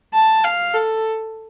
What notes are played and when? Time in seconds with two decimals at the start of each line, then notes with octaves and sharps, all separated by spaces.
0.14 A5
0.44 F5
0.75 A4